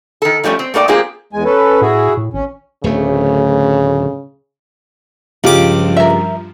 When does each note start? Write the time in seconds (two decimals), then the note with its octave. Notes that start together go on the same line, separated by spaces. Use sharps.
0.22 D#3 A4
0.44 F3 G3 A3 C4 C#4
0.59 C4
0.74 A3 A#3 A4 D5 G5
0.88 G#3 A#3 C4 F4 G4 G#4
1.33 E2 G#3 G#5
1.45 C#4 A4 B4
1.81 A2 E4 F#4 G#4
2.17 A2
2.33 G#1 C#4
2.84 D1 D2 C#3 A3
5.44 C#2 G2 F3 F4 G4 D6
5.96 A#4 E5